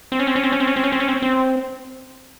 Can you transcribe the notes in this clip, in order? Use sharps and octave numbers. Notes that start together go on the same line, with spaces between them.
C4
C#4
C4
C#4
C4
C#4
C4
C#4
C4
C#4
C4
C#4
C4
C4